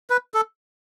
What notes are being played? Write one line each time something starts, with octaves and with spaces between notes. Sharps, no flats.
B4
A4